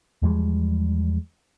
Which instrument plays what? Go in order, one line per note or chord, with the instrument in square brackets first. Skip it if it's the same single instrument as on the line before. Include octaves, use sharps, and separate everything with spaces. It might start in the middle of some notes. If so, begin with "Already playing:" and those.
[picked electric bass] E2 F3 G3 G#3